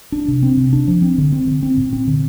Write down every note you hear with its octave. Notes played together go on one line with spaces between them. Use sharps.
D4
C3
C4
C3
D4
F3
C4
D3
C4
D3
C4
A#2
C4
D3